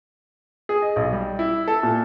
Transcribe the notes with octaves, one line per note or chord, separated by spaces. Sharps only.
G#4
D#5
B1
G3
E4
A4
A#2